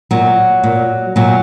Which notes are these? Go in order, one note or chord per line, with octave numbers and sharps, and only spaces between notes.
A#2 F#3
A#2
A#2 F#3